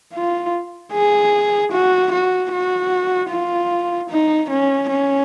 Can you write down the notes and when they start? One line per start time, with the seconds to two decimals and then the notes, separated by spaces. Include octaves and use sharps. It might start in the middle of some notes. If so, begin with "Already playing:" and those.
0.14 F4
0.93 G#4
1.72 F#4
2.12 F#4
2.52 F#4
3.30 F4
4.10 D#4
4.50 C#4
4.89 C#4